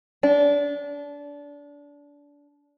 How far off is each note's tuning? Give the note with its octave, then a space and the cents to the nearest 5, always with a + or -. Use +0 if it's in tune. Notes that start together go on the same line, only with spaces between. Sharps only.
D4 -25